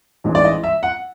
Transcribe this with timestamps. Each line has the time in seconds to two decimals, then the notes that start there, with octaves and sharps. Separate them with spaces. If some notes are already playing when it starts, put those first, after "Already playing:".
0.24 A1 G#2 E3
0.35 D5
0.45 D#5
0.64 E5
0.83 F#5